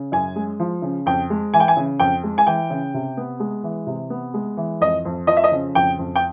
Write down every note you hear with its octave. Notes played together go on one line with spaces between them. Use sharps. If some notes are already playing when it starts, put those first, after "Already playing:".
Already playing: C#3
F#2 G#5
G#3
F3
C#3
F2 G5
G#3
E3 G#5
G5
G#5
C#3
F2 G5
G#3
G#5
E3 G5
C#3
C3
B3
G#3
E3
C3
B3
G#3
E3
F2 D#5
F2
F3 D#5
E5
D#5
C#3
F2 G5
F2
G5